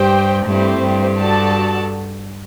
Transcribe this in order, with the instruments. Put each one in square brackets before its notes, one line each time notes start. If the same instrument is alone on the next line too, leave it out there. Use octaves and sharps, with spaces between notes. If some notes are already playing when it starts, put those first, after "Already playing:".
Already playing: [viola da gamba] G2 [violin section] G4 C5 G5
[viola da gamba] G2 [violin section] A3 C4 E4 G4 C5
[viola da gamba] G2
[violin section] F#4 A4 D5 A5